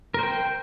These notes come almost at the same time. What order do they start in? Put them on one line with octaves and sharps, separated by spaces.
A#4 C5 G5